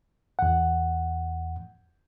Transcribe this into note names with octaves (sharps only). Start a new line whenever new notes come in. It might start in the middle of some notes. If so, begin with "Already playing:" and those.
E2 F#5